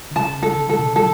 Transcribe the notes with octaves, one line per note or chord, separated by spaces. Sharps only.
D3
C#3 A5
A4
D3
E3 A4
B2 D3
D3 F#3 A4